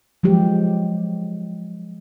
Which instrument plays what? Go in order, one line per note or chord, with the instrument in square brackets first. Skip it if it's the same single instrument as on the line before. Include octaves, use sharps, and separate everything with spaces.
[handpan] F3 F#3 G#3 G4